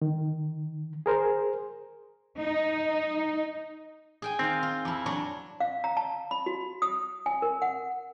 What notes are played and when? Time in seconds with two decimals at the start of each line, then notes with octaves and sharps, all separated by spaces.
0.02 D#3
1.06 G#4 A#4 C5
2.37 D#4
4.22 G#4 G5 G#5
4.39 D#3 C4 F5
4.63 F4
4.85 F2 E4
5.06 F#3 D4 C#5
5.60 F5
5.84 A#5
5.97 A5
6.31 B5
6.46 F#4
6.82 D#6
7.26 G#5
7.42 A#4
7.62 F#5